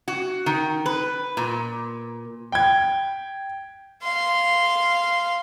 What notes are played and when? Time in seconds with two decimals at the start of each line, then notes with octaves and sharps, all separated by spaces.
0.08 F#4
0.46 D#3
0.86 B4
1.37 A#2
2.52 G5 G#6
4.02 F5 C6